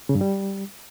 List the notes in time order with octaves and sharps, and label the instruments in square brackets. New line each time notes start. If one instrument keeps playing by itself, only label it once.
[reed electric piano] C#3
G2
G3